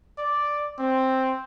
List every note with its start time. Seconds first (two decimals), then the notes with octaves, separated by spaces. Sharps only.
0.18 D5
0.79 C4